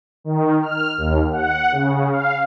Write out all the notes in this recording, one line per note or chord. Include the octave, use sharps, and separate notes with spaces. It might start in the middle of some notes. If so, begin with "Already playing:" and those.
D#3
F6
D#2
F#5
C#3
F5